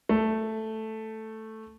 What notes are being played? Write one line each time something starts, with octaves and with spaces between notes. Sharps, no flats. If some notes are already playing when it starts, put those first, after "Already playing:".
A3